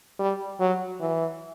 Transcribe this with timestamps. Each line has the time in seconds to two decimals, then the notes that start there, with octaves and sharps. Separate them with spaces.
0.19 G3
0.60 F#3
1.01 E3